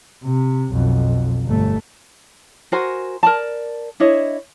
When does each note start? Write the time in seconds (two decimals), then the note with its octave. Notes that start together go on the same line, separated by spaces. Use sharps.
0.25 C3
0.72 B1 F2
1.46 G1 A3
2.72 F#4 A#4 C5 G#5
3.23 A#4 D5 A5
4.00 D4 E4 C#5 D#5